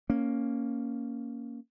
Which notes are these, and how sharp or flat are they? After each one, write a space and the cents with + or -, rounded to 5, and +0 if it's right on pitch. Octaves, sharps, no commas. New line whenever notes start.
A#3 +0 C#4 +0